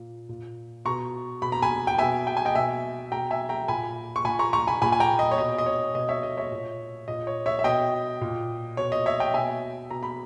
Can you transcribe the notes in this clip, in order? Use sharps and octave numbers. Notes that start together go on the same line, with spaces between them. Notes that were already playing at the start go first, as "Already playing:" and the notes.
Already playing: A#2
A#2
B2 A#5 C#6
B2 B5
A#5
G#5 B5
G5
B2 E5 G#5
G5
G#5
D#5 G5
B2 E5 G#5
B2 G5 A#5
E5 G#5
G5 A#5
A#2 G#5 B5
C#6
A#2 G#5 B5
A#5 C#6
A#5 C#6
G#5 B5
A#2 G#5 B5
G#5
G5 A#5
D#5
C#5
B2 D#5
D#5
C#5
B2 D#5
C#5 E5
D#5
C#5 E5
A#2
A#2 D#5
C#5
C#5 E5
E5
B2 D#5 G5
A#2
B2 C#5
D#5
C#5 E5
D#5 G5
B2 E5 G#5
B2 A#5
B5